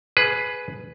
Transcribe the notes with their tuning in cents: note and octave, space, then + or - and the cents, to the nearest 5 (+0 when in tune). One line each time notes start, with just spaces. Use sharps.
G#4 +15 B4 +0